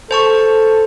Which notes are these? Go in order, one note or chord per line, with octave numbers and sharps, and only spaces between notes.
A4 C5 A5 C#6